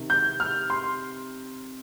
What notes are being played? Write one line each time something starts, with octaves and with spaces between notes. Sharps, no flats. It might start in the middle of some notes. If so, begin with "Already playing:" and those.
Already playing: C3 D#3
G6
F6
C6